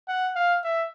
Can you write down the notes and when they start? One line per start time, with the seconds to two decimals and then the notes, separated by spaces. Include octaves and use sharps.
0.08 F#5
0.36 F5
0.64 E5